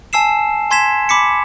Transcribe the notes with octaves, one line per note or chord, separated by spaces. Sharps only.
G#5 A5 E6 C7 E7
G#5 C6 G#6 B6 E7
B5 D6 B6 C#7